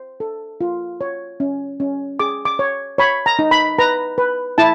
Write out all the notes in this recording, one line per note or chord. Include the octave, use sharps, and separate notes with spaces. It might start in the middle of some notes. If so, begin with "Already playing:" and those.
Already playing: C5
A4
F4
C#5
C#4
C#4
G#4 D6
D6
C#5
C#5 B5
A#5
D#4
B5
B4 A#5
B4
E4 A5